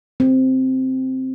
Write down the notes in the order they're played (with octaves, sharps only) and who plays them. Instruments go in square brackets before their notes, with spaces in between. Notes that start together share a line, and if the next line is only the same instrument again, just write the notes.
[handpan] C4